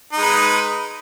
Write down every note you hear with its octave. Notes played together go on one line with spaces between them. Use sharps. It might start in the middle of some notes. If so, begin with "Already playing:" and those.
G#3 D#4 B4